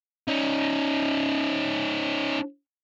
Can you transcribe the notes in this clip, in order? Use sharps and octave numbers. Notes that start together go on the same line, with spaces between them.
C#4 D#4